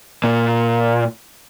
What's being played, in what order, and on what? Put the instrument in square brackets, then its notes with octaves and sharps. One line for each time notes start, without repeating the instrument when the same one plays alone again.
[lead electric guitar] A#2